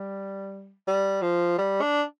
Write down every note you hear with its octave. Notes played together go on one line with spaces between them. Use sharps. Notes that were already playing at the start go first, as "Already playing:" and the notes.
Already playing: G3
G3
F3
G3
D4